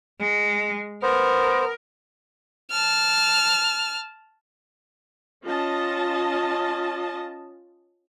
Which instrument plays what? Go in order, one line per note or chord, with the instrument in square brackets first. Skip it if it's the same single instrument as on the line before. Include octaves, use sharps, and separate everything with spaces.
[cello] G#3
[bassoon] B3 [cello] A#4 [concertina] C5
[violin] A5 F6
[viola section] C#4 F4 D#5 A5